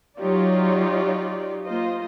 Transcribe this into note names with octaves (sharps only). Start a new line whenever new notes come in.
F#3 D#4 F4 G4 C#5 D5
A#3 F4 C5 D#5